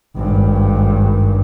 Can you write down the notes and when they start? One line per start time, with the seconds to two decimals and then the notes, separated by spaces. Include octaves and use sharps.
0.16 G#1 G2